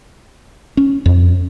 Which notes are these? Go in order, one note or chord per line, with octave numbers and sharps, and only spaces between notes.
C#4
F2